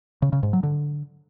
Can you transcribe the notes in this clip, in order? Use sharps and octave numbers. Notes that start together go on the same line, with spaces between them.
C#3
C#3
G#2
F#3
D3